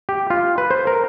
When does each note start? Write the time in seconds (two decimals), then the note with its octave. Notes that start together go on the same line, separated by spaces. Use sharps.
0.09 G4
0.30 F4
0.58 B4
0.71 C5
0.87 A#4